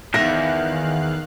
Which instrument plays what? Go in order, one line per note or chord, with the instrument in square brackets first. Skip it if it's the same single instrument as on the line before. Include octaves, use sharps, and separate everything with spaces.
[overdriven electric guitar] E2 G#2 [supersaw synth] D#3 F5 F#6 [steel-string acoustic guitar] E5 [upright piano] A#6